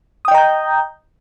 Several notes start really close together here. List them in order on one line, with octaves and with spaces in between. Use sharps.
D#6 G5 D#5 A#5 G6